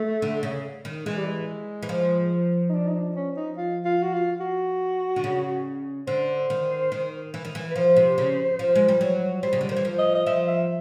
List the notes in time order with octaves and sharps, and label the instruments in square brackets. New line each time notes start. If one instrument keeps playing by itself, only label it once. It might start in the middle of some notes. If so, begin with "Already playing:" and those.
Already playing: [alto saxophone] A3
[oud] D3
C#3
D#3
[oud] E3 [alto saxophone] G#3
[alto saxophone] G3
G#3
[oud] E3
F3
[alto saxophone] D#4
D4
D#4
D4
C#4
D#4
F4
F4
F#4
F4
F#4
[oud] D3
C#3
[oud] D3 [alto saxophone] C5
[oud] D#3
D#3
E3
D#3
E3
[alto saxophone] B4
[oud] F3 [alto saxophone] C5
[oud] C3
C#3
F3
G#3
G3
F#3
[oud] G3 [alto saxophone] C5
[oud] C#3
D3
[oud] D#3 [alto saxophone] C5
[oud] E3
F3
[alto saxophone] D#5
D#5
[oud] F3 [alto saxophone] E5
[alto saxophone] E5